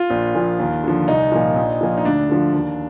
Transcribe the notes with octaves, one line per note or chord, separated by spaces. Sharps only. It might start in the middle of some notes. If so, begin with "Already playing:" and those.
Already playing: F4
A#1
A#2 F3
D#2
D3 F3
C2 D#4
A#2 F3
A#1
A#2 F3
D#4
D2 D4
D3 F3
D#2